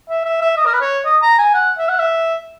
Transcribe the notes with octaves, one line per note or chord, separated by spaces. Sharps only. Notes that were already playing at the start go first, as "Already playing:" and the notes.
E5
E5
E5
D#5
A#4
B4
C#5
D#5
A#5
G#5
F#5
E5
F#5
E5